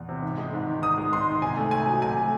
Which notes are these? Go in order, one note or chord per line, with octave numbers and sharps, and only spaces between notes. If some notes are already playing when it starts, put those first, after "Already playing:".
Already playing: E2
C3
G#2
G#3
G#2
D#3
G#2 D#6
G#3
G#2 C6
D#3
C3 G#5
A3
C3 G#5
F#3
C3 G#5
A3